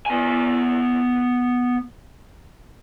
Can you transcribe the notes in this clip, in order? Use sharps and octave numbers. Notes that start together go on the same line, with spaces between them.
B3 G#5